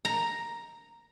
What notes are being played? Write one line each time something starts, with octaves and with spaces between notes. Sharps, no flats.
A#5